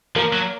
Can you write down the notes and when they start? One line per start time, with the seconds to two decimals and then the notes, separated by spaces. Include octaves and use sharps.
0.16 F3 A#3 A#4
0.33 F#3